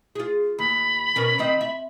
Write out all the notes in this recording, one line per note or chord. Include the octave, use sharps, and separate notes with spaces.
F4 G#4
D#2 B5
B2 C#4 A#4
D#3 C4 D#5
E5